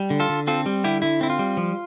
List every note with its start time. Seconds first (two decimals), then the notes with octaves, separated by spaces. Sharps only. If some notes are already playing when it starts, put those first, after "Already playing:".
Already playing: G3
0.10 D3
0.20 F4 A4
0.29 D3
0.47 C4 F4 A4
0.66 G3
0.84 D3 E4 G4
1.02 D3 E4
1.21 C4 E4
1.30 F4
1.39 G3
1.57 F3